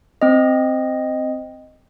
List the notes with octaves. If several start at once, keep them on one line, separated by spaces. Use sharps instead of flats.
C4 D#5